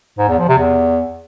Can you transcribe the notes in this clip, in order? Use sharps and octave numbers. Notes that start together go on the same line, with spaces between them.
G#2
E2
F3
C3
E2